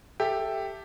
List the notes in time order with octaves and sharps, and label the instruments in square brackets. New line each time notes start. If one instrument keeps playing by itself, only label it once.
[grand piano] G4 A4 E5